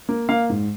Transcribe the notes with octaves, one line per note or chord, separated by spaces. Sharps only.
A#3
A#3 F5
G#2